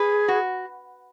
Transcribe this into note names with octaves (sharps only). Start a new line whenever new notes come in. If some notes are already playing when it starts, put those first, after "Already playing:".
Already playing: G#4 B4
F#4